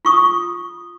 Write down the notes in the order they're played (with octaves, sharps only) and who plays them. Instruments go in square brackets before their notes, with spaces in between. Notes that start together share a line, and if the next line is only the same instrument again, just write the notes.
[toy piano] F4 C#6 D#6